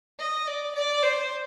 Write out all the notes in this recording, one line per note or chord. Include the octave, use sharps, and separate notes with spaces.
D#5
D5
D5
C5